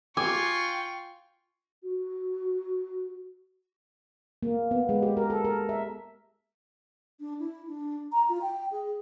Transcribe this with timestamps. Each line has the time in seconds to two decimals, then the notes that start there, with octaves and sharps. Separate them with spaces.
0.17 F4 G5 G#5 C#6 D6
1.83 F#4
4.43 A#3
4.71 B3
4.89 G#3
5.03 G4
5.17 A#4
5.30 A4
5.45 A#4
5.69 E5
7.20 D4
7.39 E4
7.67 D4
8.12 A#5
8.29 F4
8.42 G5
8.71 G#4